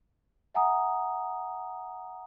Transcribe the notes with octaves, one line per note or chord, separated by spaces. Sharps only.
E5 F#5 G#5 A#5 D#6